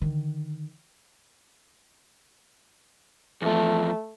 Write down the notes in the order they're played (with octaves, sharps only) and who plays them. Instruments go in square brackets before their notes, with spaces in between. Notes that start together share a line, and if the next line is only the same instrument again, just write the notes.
[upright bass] D3 D#3
[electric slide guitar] E2 F3 [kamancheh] A3